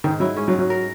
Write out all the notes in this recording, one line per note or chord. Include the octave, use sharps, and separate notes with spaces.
G#2 D#3
F#3 E4
G#3 C#4
F#3
G#2
F#3
A#4